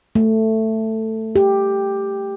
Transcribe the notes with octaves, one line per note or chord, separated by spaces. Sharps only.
A3
G4